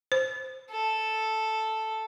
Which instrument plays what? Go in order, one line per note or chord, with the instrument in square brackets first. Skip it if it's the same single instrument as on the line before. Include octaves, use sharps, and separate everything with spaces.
[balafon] C5
[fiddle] A4